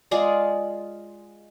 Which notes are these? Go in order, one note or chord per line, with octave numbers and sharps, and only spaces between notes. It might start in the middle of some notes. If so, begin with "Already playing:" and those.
G#3 F4 G#4 D5